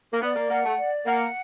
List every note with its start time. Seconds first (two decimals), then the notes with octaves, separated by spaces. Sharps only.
0.13 A#3
0.22 B3 D5
0.36 A#3
0.50 A#3 F#5
0.65 A3
0.78 D5
1.05 A#3 F#5